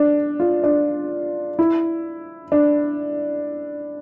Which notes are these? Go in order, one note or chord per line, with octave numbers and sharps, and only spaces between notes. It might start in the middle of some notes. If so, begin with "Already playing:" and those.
Already playing: D4
F4
D4
E4
D4